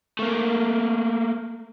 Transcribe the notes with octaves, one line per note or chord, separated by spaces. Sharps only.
A3 A#3